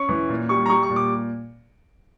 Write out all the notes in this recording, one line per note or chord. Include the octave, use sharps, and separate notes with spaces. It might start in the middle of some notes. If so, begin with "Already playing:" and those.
Already playing: C#4 C#6
E3
A#2
G3 C#6
A#5
G3 C#6
C#6
A#2
D6